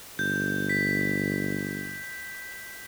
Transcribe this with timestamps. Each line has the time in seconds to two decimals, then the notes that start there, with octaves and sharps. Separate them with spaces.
0.19 G1 G6
0.69 B6